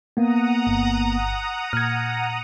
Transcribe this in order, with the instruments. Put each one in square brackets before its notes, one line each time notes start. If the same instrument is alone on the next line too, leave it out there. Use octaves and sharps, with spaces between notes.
[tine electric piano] A#3 B3 [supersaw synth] F#5 A#5 D#6
[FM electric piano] G1
[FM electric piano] A#2 [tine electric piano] F6 G#6